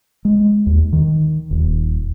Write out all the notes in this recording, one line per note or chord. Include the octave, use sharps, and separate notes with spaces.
G#3
D#2
D#3
D#1